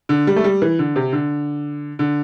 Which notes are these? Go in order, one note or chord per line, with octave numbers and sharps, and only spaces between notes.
D3
G3
A3
G3
E3
D3
C3
D3
D3